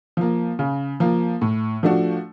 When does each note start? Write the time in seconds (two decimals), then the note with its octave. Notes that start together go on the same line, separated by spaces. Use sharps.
0.17 F3 A#3
0.59 C#3
1.00 F3 A#3
1.41 A2
1.83 F3 A3 D4 F#4